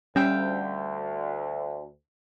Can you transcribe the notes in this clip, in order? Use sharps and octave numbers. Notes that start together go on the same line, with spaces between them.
D2 G3 C#4 E5 F5 G5